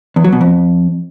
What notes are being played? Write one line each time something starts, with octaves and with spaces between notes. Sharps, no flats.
E2
F#3
B2
F2